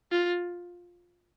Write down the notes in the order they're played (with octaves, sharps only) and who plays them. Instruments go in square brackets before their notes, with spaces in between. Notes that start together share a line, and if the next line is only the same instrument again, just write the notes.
[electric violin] F4